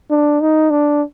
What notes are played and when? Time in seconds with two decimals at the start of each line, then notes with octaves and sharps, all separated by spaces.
0.10 D4
0.41 D#4
0.70 D4